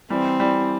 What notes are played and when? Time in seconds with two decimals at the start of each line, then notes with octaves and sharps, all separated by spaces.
0.10 E3 G3 C4
0.40 E3 G3